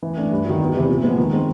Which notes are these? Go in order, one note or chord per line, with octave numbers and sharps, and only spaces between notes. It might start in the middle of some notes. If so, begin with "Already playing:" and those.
E3
A3 D4
G2
D#3 F#3
E2
C3 E3 G3
A#2
F3 G#3 B3
D#3
G#3 C4